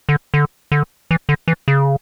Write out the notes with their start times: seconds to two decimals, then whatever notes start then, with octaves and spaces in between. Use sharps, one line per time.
0.09 D3
0.34 D3
0.72 D3
1.11 E3
1.29 D3
1.48 E3
1.68 C#3